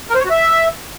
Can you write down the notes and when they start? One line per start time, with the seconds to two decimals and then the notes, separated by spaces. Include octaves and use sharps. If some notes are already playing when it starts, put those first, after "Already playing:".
0.10 A#4
0.15 C5
0.20 C#5
0.25 F#4
0.30 E5